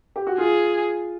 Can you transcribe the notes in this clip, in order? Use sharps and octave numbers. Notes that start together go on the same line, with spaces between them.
G4
F#4
F4 G#4